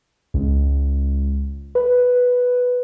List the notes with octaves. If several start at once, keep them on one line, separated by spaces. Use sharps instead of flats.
C#2
B4